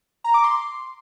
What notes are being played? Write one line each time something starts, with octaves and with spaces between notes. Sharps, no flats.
A#5
D6
C6